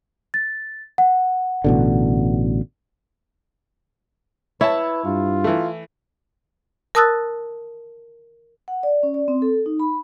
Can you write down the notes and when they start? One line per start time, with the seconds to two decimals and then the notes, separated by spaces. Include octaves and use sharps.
0.34 A6
0.98 F#5
1.64 A1 B2 D3
4.61 E4 B4 C#5 A5
5.05 G2 F4
5.44 E3 A3
6.95 A#4 A5 D#6 E6 F#6 A6
8.68 F#5
8.83 D5
9.03 C#4
9.14 D5
9.28 C4
9.42 A4
9.66 D#4
9.80 B5